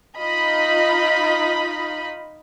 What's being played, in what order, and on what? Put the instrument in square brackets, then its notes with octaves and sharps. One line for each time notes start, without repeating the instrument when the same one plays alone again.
[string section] D#4 F4 D#5 B5